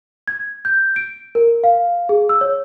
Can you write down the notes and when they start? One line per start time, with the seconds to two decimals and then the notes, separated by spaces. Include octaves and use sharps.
0.28 G#6
0.65 G6
0.96 D7
1.35 A#4
1.64 F5
2.09 G#4
2.29 E6
2.41 C#5